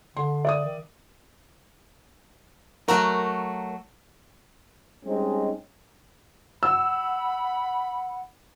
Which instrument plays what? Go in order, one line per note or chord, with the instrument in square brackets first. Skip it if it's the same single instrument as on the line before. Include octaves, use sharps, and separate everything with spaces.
[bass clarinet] D3 [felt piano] C6
[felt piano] D5 E5 D#6
[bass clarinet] D#3
[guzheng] F#3 A3 F#4 [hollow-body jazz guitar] A#4
[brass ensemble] G3 G#3 C4 C#4 D#4
[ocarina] F#5 [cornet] B5 [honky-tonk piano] E6